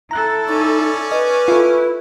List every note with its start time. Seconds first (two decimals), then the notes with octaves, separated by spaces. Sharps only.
0.11 E4 A4 A#5 F#6
0.48 C#4 D#4 D5
1.12 B4 D#5
1.48 E4 F4 A4